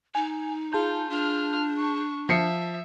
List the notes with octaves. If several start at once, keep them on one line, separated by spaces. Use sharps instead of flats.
D#4 G#5
F4 G#4 A5 G6
D4 F4 F6
C#6
F3 E5 C7 C#7